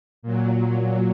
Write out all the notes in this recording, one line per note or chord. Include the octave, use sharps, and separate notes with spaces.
A#2 F#3